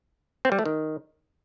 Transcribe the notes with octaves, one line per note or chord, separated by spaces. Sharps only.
C4
G3
A3
D#3